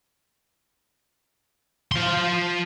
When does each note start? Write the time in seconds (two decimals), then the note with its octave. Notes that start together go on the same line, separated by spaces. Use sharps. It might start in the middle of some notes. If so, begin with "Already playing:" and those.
1.92 F3 C6